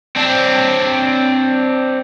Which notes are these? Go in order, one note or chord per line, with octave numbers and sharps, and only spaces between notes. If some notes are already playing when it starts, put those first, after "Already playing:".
C4 D4